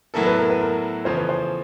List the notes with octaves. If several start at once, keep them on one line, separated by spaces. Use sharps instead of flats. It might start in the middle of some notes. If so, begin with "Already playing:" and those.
A2 F#3 B3 E4 A4 A#4
B4
A#4
B4
A#4
E2 C#3 F3 A3 C#4 C5
B4
C5